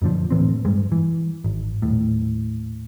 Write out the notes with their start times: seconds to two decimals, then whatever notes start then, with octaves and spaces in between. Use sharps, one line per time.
0.02 F#2 A#2 D3 F3
0.30 D2 A2 E3 C4
0.65 G2 G3 G#3
0.92 E3
1.44 G#1
1.82 D#1 A2